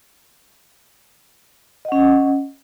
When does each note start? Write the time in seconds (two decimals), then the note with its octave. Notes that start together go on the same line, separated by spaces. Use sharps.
1.85 D#5
1.88 F#5
1.92 C#4